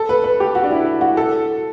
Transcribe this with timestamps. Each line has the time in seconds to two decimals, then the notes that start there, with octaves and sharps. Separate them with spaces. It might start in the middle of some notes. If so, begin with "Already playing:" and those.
Already playing: A4
0.09 B4
0.24 B4
0.40 G4
0.55 F#4
0.64 D4
0.71 E4
1.01 F#4
1.17 A4